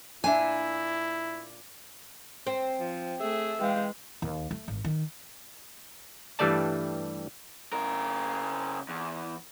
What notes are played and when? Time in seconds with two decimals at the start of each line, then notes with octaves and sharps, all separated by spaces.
0.24 A#2 D4 E4 E5 G#5
2.47 C4
2.80 F3
3.20 A3 G#4 E5
3.61 E3 G#3 F5 G5
4.22 D#2
4.51 A3
4.68 G#1
4.84 D#3
6.39 G2 E3 G3 A3 D5 A5
7.73 C#3 A#4
8.89 E2